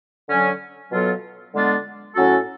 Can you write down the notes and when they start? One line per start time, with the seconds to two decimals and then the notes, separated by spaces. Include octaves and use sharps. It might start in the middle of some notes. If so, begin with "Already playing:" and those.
0.28 D3 F#3 C#4
0.90 B2 F#3 B3 F4 A4
1.53 D3 G#3 B3 D4 F4
2.14 A2 F#3 C#4 F#4 A4